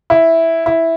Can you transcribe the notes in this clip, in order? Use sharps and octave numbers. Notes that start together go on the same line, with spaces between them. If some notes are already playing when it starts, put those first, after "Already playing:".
E4
E4